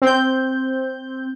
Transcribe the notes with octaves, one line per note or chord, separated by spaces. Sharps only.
C4 G6